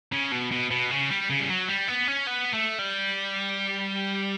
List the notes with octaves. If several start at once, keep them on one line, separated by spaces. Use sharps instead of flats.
C#3
B2
B2
B2
C#3
G3
C#3
G3
F#3
G3
B3
C#4
B3
A3
G3